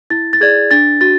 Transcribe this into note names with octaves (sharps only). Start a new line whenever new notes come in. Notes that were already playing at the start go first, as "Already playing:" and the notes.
E4 A6
A6
G#4 D5 G#6
D4 A6
F#4 A6